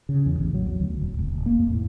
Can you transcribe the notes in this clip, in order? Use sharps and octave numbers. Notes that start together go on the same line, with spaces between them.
C#3
E2
A1
F#3
E2
D2
D1
F1
D#1
A#3
F2
A2